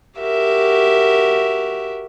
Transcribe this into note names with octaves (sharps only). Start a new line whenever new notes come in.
F#4 G4 A#4 E5